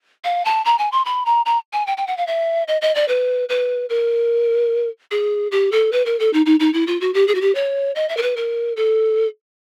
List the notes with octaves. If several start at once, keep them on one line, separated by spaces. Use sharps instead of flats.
F5
A5
A#5
G#5
C6
B5
A#5
A#5
G#5
G5
G5
F#5
F5
E5
D#5
D#5
D5
B4
B4
A#4
G#4
G4
A4
B4
A#4
A4
D#4
D#4
D#4
E4
F4
F#4
G4
G#4
F#4
G4
C#5
D#5
E5
A#4
B4
A#4
A4